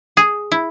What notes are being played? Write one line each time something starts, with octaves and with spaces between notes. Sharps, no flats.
G#4
E4